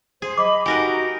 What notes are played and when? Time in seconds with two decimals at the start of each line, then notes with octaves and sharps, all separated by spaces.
0.22 G#4 C5
0.37 D#5 B5 D6
0.66 D#4 F#4 G4 A#4 B4 G#5